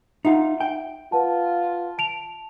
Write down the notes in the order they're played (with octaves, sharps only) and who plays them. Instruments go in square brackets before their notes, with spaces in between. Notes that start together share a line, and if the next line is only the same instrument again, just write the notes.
[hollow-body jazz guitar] D#4 F4 [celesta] E5 F#5
[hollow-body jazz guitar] G5
[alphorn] F4 [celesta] B4 F#5 A5
[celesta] A5 D7 F7